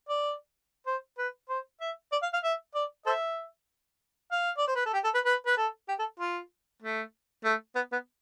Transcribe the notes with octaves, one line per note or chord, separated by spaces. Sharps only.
D5
C5
B4
C5
E5
D5
F5
F5
E5
D5
A4 C5 E5
F5
D5
C5
B4
A4
G4
A4
B4
B4
B4
A4
G4
A4
F4
A3
A3
B3
B3